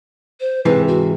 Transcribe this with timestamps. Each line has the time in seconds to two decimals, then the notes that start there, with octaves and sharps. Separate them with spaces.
0.40 C5
0.65 G#2 C3 E3 B4
0.88 F#4